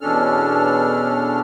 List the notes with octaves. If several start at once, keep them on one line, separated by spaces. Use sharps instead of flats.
E2 B2 C#4 D4 A4 F6